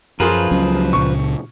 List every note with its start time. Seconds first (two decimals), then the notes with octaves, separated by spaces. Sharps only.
0.20 F#2 F3 F4 G#4 A#4 B4
0.51 C#2 F#3 C#4
0.93 C#2 A#2 C#3 C#6